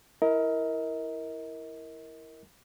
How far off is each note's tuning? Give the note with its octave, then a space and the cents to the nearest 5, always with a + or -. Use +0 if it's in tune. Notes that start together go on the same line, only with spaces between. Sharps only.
E4 +0 A#4 +0 D#5 +35